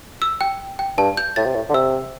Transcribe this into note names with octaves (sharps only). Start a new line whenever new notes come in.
E6
G5
G5
G2 A5
G6
A2 A6
C3
A2
D3
C3 E6